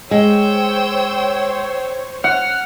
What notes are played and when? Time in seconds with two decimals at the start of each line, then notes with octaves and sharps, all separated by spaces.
0.11 G#3 C5 C#5 G5 E6
2.24 F#5 F6